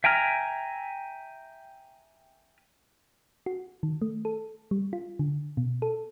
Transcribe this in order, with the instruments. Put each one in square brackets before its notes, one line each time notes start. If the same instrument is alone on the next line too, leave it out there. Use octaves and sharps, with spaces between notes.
[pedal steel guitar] E5 G5 G#5 A#5 F6
[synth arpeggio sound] F#4
D#3
A3
A4
G3
F4
D3
B2
A4